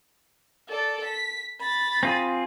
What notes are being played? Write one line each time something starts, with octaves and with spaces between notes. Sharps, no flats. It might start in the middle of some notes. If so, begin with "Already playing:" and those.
A4 D5
B6
B5 A6
C4 F4 G#4